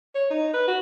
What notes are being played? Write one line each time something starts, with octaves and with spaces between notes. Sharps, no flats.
C#5
D#4
B4
F#4